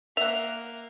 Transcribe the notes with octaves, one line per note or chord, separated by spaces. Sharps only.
A#3 E5 F#5 F7